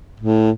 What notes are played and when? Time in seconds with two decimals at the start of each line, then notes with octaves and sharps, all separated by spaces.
0.20 A2